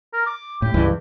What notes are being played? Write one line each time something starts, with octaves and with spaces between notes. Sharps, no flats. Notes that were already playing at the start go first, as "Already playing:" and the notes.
A#4
D6
A2 G4
C#2 G2 E3